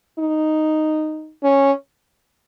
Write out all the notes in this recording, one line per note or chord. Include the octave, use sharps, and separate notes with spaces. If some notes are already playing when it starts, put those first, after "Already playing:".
D#4
C#4